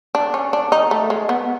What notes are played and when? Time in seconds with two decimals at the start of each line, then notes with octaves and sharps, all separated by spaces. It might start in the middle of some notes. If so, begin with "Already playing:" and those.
0.15 D4
0.34 C#4
0.53 D4
0.72 D#4
0.91 A3
1.10 G#3
1.29 B3